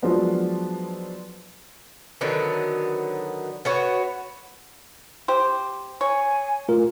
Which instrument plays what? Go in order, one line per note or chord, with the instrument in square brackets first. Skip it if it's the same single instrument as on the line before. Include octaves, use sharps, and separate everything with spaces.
[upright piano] F3 F#3 G#3 B3 D4
[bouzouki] D3 D#3 F#3 B3
B3 F#4 C#5
[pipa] G4 C5
[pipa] C#5 [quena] G#5
[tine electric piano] A3 F4 A#4